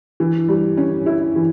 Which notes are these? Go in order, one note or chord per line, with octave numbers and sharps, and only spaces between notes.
E3
G3
C#4
E4
E3